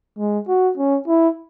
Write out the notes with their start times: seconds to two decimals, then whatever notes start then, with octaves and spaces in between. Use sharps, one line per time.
0.18 G#3
0.48 F#4
0.78 C#4
1.08 E4